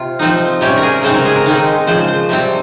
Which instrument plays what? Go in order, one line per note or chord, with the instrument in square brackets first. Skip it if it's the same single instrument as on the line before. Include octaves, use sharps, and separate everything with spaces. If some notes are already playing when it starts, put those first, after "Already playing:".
Already playing: [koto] C3 F4
F3 C4 D#4
C3 G3 C#4 G4
A#4
G#4
C#3 G#3 C4 D#4 C5
A#4
G#4
A#4
D#3 G#3 C4 D#4
C#3 F3 G#3 C5
C5
C3 G3 C4